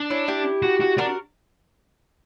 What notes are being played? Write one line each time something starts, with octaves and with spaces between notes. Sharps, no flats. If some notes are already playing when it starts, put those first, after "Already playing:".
Already playing: D4
C#4 E4
E4 G4
F#4
F#4
D4 F#4 A#4